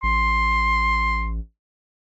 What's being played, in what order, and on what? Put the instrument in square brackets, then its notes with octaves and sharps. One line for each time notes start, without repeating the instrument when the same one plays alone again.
[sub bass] A1 [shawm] C6